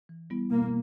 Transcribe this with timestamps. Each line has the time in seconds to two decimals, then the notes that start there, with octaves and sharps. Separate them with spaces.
0.09 E3
0.30 G3 B3 E4
0.50 B2 A#3